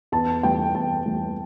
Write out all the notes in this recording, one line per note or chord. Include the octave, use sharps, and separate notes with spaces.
E2 A5
E3 G3 G5
E2 A5
E3 G3